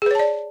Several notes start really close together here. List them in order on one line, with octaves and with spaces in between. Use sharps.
G#4 B4 C#5 A5 D5